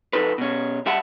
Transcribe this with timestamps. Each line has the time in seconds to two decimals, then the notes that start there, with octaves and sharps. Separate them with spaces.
0.13 F2 D#4 A4 B4
0.38 B2 C#4
0.86 G3 G4 E5 F#5 A5 B5